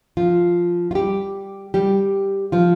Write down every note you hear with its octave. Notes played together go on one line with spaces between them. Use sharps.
F3 F4
F4
G3 G4
G3 G4
F3 F4